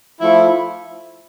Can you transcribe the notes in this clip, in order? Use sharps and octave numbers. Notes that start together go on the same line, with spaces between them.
F3 A3 E4